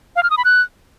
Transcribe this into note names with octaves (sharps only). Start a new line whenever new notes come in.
F5
F6
D#6
B5
F#6